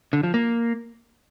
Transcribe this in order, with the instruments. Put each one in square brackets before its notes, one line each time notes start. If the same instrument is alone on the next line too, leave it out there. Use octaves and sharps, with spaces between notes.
[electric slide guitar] D3
F3
A#3